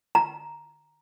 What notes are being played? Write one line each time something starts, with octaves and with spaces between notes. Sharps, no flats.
A#5